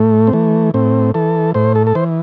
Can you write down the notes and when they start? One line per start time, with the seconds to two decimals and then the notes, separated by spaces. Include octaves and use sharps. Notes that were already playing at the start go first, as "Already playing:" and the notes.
Already playing: A2 A3
0.27 C4
0.33 E3 A3
0.74 A2 C4
1.14 E3 A4
1.54 A2 C5
1.75 A4
1.87 A4
1.95 E3 C5